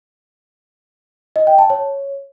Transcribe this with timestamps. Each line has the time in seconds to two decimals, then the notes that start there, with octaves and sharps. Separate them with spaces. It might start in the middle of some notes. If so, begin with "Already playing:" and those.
1.36 D#5
1.47 G5
1.58 A5
1.70 C#5